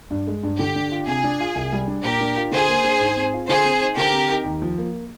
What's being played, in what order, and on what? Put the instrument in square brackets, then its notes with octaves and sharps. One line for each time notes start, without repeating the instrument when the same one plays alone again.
[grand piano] G2
G#3
G2
[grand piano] D3 [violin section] G4
[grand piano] D4
F4
[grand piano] C3 [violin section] G#4
[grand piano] D4
F4
C2
G3
D4
[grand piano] A#2 [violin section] G4 A#4
[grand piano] D4
F4
[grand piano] D3 [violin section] G#4 C5
[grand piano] A#3
D4
G#2
C4
F4
[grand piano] D3 [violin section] G#4 C5
[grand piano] C4
D#4
[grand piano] D3 [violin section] G4 A#4
[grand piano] C4
D#4
D#2
F3
A#3